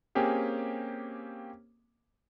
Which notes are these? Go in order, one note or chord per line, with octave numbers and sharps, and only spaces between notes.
A#3 C4 C#4 G4 G#4